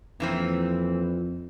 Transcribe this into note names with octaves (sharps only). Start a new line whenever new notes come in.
F2 A#2 E3 C4